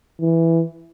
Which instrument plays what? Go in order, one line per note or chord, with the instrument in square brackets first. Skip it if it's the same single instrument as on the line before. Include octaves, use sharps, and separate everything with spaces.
[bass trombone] E3